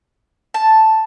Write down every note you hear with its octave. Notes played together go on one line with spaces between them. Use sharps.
A5